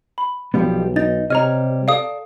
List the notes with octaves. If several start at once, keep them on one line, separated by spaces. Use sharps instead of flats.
B5
B1 F3 G3 B3
D#4 A6
C3 G3 C#5 D#5 A#5 F6
A4 D5 F5 D#6